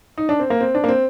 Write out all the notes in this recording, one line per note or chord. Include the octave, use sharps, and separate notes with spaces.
D#4
D4
C4
A#3
C4
D4
A#3
C4